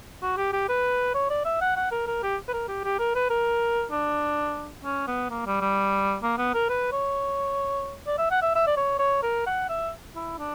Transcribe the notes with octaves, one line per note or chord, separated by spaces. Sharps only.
F#4
G4
G4
B4
C#5
D5
E5
F#5
F#5
A#4
A#4
G4
B4
A#4
G4
G4
A#4
B4
A#4
D4
C#4
B3
A#3
G3
G3
A#3
B3
A#4
B4
C#5
D5
E5
F#5
E5
E5
D5
C#5
C#5
A#4
F#5
E5
E4
D4